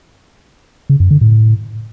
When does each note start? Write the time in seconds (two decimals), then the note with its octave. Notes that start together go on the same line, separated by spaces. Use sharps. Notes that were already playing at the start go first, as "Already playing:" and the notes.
0.90 C#3
1.00 F#2
1.11 D3
1.21 A2